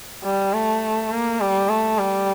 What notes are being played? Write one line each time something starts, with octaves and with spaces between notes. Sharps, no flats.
G3
A3
A#3
G3
A3
G3